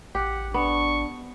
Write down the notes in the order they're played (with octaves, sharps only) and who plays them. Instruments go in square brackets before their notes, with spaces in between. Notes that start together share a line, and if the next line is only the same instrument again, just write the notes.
[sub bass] A1 [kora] G4 [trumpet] F#5
[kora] B3 [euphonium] D4 [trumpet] C#6